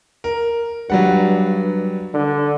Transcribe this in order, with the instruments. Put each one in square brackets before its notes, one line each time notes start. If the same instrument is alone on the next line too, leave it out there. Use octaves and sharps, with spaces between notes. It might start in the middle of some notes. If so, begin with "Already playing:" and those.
[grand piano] A#4
[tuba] G2 [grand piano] F#3 G3 F#5
[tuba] D3